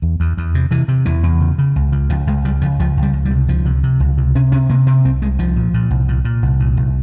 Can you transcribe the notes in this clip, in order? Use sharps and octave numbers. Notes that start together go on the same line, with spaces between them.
E2
E2
E2
C3
C3 E3
C3
E2 E3
E2
C#3
C#3
C#2
C#3
C#2 F3
C#2 G#3
C#3 G3
C#2 F3
C#2 F3
C#2
G3
C#2
G3
C3
C#2 F3
C3
C3
C#2
C3
C3 C#4
C3 C#4
C3 A#3
C3 C4
C2 C4
C2 G#3
C2 F3
A#2
A#2
C2
A#2
A#2
C2
A#2
C2